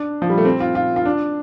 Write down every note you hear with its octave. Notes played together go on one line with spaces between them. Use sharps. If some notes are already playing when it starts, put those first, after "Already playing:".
Already playing: D4
F3
G3
A3
C4
F4
F4
F4
D4